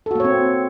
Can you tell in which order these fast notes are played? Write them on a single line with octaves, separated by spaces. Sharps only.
A4 F#4 A#3 C#5 C4